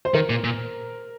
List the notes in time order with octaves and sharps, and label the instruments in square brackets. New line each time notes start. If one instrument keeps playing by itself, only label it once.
[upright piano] C5
[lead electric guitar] D#3 [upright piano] A#4
[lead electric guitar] A#2
A#2